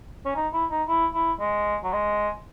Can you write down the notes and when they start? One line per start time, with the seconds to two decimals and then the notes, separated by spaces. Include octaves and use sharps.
0.25 C#4
0.36 D#4
0.53 E4
0.71 D#4
0.88 E4
1.14 E4
1.40 G#3
1.84 F#3
1.93 G#3